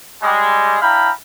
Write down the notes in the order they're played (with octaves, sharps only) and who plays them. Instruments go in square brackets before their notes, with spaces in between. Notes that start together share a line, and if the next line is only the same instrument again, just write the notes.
[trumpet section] G3 G#3
D4 E4 F5 G5 A#5 B5